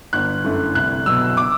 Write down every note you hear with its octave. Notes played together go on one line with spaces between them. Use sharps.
G1 F#6
F#2 D3 A3 E4
C2 F#6
B2 F#3 E6
D6